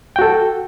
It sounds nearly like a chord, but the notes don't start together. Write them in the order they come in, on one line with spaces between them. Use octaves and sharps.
G5 F#4 A4